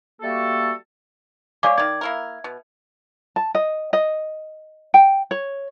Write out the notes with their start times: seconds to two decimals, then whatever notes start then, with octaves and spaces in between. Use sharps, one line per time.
0.21 G3 A3 A#3 F#4 A4
1.63 G#3 G#4 C#5 D5 F5 D6
1.78 D#3 D5 G#6
2.01 A#3 E4 A#4
2.44 B2
3.36 A5
3.55 D#5
3.93 D#5
4.94 G5
5.31 C#5